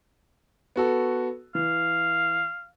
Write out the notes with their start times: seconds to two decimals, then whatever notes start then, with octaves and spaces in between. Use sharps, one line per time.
0.76 B3 F#4 A4
1.55 E3 F5